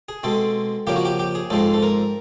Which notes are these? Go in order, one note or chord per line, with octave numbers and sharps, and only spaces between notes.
G#4
B2 G#3 C4 A4
F2 C#3 F3 A#3 G4
F#4
G4
G4
G#4
G#2 F3 G#3 C4 A4
A4
A#4